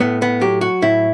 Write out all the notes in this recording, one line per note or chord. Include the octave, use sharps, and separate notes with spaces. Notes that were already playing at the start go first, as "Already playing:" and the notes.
A2 B3
B3
F#3 G4
F#4
A2 E4